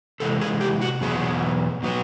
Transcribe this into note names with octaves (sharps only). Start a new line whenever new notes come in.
C3 E3 G#3 A4
G#4
G4
F#4
E2 B2 F#3 B3 G#4
B2 F#3 B3